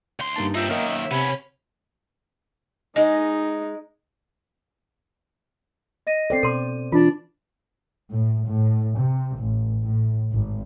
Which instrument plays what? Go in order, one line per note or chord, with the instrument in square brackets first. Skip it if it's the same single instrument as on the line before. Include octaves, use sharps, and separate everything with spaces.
[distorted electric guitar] D2 C6
[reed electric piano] G2 A#3 A5 [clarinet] D#4
[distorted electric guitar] C4 D#4 [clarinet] F4 [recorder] E5
[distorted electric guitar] F#2 D#3 [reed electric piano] A#3 E6 F6 [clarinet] D#5
[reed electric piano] C3 [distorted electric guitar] B3 C#4 [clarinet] B5
[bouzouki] G#3 [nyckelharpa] D#4
[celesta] D#5 A#6 D#7
[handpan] C4 C5 D5 [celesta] A4 G5 C7
[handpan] B2 [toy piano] A4 C6 D6 [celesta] D#7
[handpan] E3 [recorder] D4 [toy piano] F4
[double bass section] A2
A2
C3
A1
A2
G#1